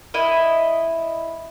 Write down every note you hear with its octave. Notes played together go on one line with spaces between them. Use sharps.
E4 D#5